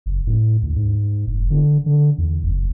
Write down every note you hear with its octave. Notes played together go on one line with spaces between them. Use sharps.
F#1
A2
D2
G#2
F1
D3
D3
E2
F#1